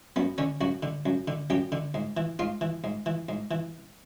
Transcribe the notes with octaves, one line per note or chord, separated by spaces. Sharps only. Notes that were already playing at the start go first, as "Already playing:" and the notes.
F#2 B3
D3 C#4
F#2 F#4
D3
F#2
D3
F#2 G4
D3
G#2
E3
G#2 F4
E3
G#2
E3
G#2
E3